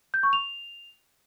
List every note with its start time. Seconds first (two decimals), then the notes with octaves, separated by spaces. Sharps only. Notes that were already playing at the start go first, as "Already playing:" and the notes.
0.14 G6
0.23 C#6
0.33 F7